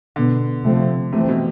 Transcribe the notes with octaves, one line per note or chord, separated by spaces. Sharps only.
B2 D3 B3
C3 F3 A3 C4
C3 E3 A3 C4
B2